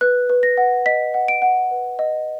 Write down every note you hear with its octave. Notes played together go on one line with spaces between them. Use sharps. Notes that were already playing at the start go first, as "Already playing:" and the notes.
B4 F#6
B4
A#6
F#5
D#5 B6
F#5
D7
F#5
B4
D#5